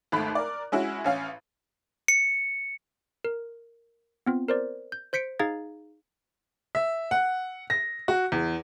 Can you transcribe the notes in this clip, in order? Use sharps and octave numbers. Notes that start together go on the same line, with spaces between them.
G#1 D#2 A3 B5 F#6
A#4 D5
G#3 C#4 E4 F#4
A1 C#4 F5
C#7
A#4
B3 C4 F4
A#4 C5 D5
G6
C5 G6 B6 C#7 D7
D#4 G#4 F5 A#5 G#6 A6
E5
F#5
A#6
F#4
E2